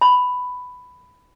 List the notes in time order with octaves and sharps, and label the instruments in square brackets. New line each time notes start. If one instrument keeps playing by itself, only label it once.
[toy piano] B5